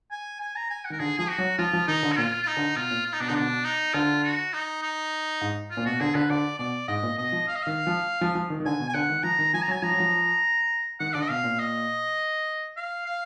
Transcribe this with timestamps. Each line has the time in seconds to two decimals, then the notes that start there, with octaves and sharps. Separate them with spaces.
0.11 G#5
0.40 G#5
0.56 A#5
0.70 G#5
0.85 F#5
0.90 D#3 A#4
0.99 D3 G#4
1.19 F3 G#4
1.29 F#4
1.38 F#3
1.58 F3 F4
1.73 F3
1.88 D#3 D#4
2.03 D3
2.12 F#4
2.17 A#2 F4
2.43 F4
2.47 D#4
2.57 D3
2.76 B2 F4
2.91 A#2
3.06 F4
3.13 D#4
3.20 B2 D4
3.28 D3 D#4
3.35 B2 D4
3.65 D#4
3.93 D3 F4
4.24 F#4
4.53 D#4
4.82 D#4
5.41 G#2
5.71 F4
5.77 A#2
5.86 B2 F#4
6.00 D3 G#4
6.15 D3 B4
6.30 D3 D5
6.59 B2 D5
6.88 G#2 D#5
7.03 A#2
7.18 B2 D#5
7.32 F3
7.48 F5
7.55 D#5
7.63 D#3 F5
7.87 F3
8.21 F3
8.35 F3
8.50 D#3
8.60 D#3
8.65 D3 G#5
8.80 B2
8.88 G#5
8.94 D3 F#5
9.10 D#3
9.23 F3 A#5
9.39 D#3
9.54 F3 G#5
9.62 A#5
9.68 F#3
9.71 G#5
9.82 F3 A#5
9.91 F#3
10.00 F3
11.00 D#3 F#5
11.14 D3 D5
11.22 D#5
11.29 B2 F5
11.44 A#2
11.59 D#5
12.77 F5
13.06 F5